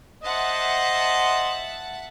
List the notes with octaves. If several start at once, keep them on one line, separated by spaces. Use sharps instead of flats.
C5 D#5 E5 F#5 A5